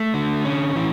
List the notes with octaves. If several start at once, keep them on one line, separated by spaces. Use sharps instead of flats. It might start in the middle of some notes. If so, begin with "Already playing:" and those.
Already playing: A3
D3
C#4
E3